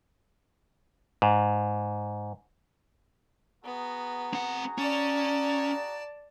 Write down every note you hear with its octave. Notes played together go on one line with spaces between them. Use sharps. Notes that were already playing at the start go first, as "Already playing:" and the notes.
G#2
B3 F#4 G#4 A#5
C4 F#5
C#4 D5 A5